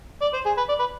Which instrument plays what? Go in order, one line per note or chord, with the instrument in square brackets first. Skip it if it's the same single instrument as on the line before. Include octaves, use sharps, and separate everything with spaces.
[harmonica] D5
C5
G#4
B4
D5
B4